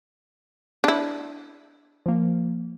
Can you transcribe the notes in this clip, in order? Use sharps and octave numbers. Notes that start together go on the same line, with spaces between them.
D4 E4
F3 A#3